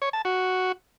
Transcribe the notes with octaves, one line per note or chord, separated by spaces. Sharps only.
C#5
A5
F#4